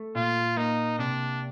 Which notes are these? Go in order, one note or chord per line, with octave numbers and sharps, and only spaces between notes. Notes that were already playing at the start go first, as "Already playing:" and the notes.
Already playing: A3
A#2 F4
A#3 D#4
C3 D4